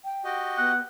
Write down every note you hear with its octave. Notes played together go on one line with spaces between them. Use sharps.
G5
F#4 G4 D#5
B3 F#5